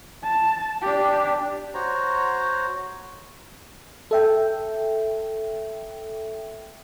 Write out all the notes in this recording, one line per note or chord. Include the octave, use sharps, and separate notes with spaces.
A5
D4 G4
F#4 C5 C#5 A#5
A4 E5 G5